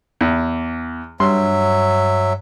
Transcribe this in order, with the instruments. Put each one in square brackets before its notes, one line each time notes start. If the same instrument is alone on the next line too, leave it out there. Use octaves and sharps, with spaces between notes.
[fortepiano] E2
[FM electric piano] G2 [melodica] F#3 E5 [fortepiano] C6